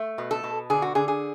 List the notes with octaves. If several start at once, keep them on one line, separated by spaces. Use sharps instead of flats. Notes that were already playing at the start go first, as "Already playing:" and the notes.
Already playing: A3
B2
A4
B2
D3 G#4
F#4
D3 G#4
G#4